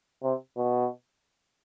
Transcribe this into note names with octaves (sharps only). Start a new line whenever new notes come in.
C3
B2